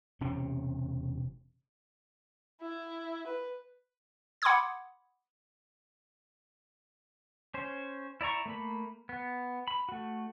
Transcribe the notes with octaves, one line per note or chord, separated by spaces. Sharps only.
E1 C3 C4 C#4
E4
B4
F#5 B5 C6 D6 D#6 G#6
C#4 C5
E4 D5 A#5 C#6
A3 A#3 B5
B3
B5
A3 F#4